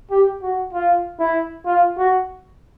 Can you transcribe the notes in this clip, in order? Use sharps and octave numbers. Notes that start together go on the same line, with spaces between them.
G4
F#4
F4
E4
F4
F#4